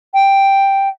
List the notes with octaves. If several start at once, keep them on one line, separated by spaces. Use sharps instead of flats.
G5